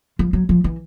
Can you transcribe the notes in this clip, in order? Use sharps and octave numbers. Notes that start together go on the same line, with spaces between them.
F3
F#3
F3
E3